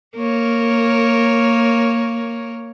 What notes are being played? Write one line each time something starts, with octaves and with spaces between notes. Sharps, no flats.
A#3 A#4 C#5